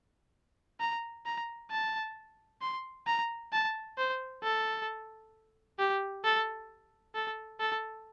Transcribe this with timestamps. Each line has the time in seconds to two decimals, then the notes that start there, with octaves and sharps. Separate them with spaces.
0.80 A#5
1.26 A#5
1.71 A5
2.61 C6
3.07 A#5
3.52 A5
3.98 C5
4.43 A4
5.79 G4
6.24 A4
7.15 A4
7.60 A4